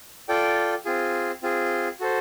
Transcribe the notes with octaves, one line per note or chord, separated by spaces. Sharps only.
F4 A4 D5 G5
C4 F4 G#4
C4 F4 G#4
F#4 A4 C5